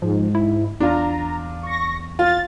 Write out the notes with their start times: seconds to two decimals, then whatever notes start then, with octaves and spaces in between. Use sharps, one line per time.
0.02 G#2 F3
0.35 E4
0.80 E2 D4 F4 A#5
1.63 C#6 A#6
2.19 F4 A6